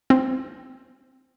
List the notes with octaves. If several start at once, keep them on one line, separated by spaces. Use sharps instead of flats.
C4